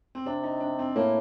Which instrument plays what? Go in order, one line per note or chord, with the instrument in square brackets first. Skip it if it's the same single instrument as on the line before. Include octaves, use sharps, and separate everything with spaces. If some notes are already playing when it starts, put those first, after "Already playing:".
[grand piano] C4
[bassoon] C3 [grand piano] D4
[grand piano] D#4
D4
C4
[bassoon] A2 [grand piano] A#3